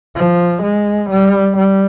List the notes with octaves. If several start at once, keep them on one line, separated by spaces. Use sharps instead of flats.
F3
G#3
G3
G3